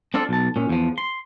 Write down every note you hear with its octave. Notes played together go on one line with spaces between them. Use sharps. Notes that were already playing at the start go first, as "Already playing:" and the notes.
C4 D4 F4 A4
B1 A5
A#2 C#4
E2 F3
C6